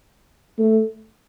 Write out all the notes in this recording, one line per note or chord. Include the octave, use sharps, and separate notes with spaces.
A3